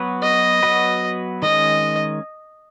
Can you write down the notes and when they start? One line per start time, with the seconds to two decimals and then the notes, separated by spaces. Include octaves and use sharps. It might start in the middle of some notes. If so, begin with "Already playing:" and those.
Already playing: F#3 B3 F#4 B4
0.22 D#5
0.63 F#3 B3 F#4 B4
1.42 D#3 G#3 C#4 D#5